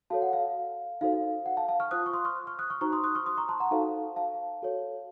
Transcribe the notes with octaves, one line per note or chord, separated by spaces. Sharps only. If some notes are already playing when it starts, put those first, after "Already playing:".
F#4 A4 C#5 F5 A5
F#5
F5
D#4 F#4 A4 C5 F5
F#5
F5 A5
F5 A5
C#6 F6
F4 C5 D#6 F#6
C#6
C6 D#6
C#6 F6
C#6 F6
D#6 F#6
C#6 F6
D#4 F#4 C5 A#5 C#6
C6 D#6
D#6 F#6
C#6 F6
C6 D#6
A#5 C#6
A5 C6
F#5 A#5
D#4 F#4 A4 C5 F5 A5
F5 A5
F#4 A4 C#5